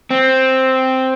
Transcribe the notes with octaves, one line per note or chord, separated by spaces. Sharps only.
C4